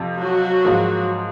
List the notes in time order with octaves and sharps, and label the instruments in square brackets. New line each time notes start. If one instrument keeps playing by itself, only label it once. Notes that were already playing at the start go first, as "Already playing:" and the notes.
Already playing: [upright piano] F2 C3 F3
[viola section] F#3 F#4
[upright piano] G#2 F3 A#3